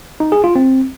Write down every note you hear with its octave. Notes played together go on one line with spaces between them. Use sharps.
D#4
G#4
F4
C4